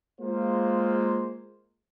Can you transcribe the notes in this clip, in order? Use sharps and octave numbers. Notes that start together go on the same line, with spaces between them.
G#3 A#3 F4 C5